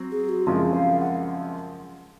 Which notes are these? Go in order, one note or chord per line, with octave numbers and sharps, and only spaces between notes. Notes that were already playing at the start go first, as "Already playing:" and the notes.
Already playing: F#3 C4
G#4
F#4
F#2 C#3 F3 G#3 C4 G#4
F5
F#5